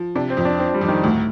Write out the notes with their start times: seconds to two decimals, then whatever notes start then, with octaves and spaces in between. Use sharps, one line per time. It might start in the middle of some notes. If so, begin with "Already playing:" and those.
Already playing: F3
0.15 C3 D4
0.30 C4
0.37 F2
0.45 D4
0.59 F3 C4
0.74 G3
0.81 F2
0.88 D#3
1.03 D2 A2